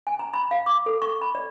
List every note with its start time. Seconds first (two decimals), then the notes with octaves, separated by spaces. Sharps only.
0.07 G#5
0.19 A#5
0.34 B5
0.51 F5
0.66 D6
0.86 A4
1.02 C#6
1.21 B5
1.35 D5